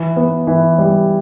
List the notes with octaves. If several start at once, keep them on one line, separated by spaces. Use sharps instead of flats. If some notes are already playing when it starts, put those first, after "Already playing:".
Already playing: E3
B3
E3
G3